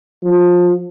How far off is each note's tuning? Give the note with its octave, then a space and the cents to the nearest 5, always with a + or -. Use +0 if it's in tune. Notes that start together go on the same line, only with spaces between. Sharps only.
F3 +20